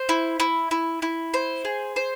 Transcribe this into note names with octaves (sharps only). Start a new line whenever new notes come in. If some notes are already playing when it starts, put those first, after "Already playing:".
Already playing: C5
E4
E4
E4
E4
C5
G#4
C5